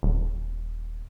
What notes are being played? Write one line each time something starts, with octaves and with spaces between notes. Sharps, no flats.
D#1